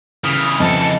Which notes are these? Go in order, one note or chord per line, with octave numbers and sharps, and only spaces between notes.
C#3 E3 D#6 F6 B6
F2 D#5 A5 C#7